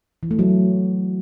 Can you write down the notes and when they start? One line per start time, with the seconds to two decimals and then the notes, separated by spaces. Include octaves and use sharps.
0.23 E3
0.31 A3
0.39 F#3